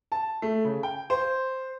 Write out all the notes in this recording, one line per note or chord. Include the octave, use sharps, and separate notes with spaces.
A5
A3
C#3
G5
C5